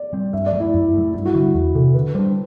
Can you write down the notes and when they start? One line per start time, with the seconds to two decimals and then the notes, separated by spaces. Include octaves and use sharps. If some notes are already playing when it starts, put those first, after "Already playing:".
Already playing: D5
0.13 G3 C4
0.33 G2 E5
0.46 D5
0.53 F#3 A3
0.60 E4
0.74 F#2 E4
0.93 F#3 A3
1.14 G2 E4
1.25 F#4
1.34 D3 G3 E4
1.54 E2 F#4
1.75 C3 E3 A4
1.94 D3 B4
2.14 G3 D4 C5